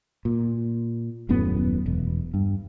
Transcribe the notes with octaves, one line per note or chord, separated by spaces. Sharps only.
A#2
D#1 F#2 A2 B3
E1
G2